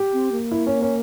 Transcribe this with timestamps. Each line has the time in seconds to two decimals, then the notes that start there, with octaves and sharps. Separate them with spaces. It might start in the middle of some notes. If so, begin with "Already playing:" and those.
Already playing: G4
0.13 C4
0.32 A#3
0.51 E4
0.67 C#4
0.82 C#4